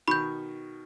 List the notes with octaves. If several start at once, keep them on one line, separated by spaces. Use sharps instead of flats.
B2 D#3 B5 C#6 G6